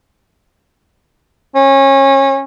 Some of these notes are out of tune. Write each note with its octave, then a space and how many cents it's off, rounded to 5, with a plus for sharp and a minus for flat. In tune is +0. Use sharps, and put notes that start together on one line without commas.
C#4 -25